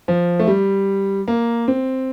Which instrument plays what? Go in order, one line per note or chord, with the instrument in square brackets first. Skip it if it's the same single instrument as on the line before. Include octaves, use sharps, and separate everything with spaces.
[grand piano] F3
A3
G3
A#3
C4